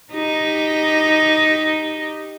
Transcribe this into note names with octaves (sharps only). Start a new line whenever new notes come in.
D#4 G4